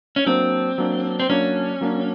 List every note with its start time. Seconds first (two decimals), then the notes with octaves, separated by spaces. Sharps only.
0.16 C#4
0.26 F#3 A#3 C4 D4
0.78 F#3 A#3 D4
1.20 C4
1.29 F#3 A#3 C#4 D4
1.81 F#3 A#3 D4